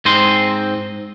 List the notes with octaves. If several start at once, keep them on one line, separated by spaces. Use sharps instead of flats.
G#2 C4 C5 D#5 C6